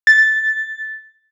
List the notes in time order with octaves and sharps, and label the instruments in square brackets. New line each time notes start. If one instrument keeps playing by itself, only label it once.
[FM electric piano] A6